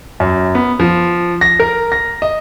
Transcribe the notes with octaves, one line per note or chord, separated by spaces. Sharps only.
F#2
B3
F3
A#6
A#4
A#6
D#5